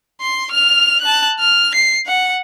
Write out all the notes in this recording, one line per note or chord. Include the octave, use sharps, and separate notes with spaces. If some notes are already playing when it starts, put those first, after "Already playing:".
C6
F6 F7
A5 F#6
F6
C7
F#5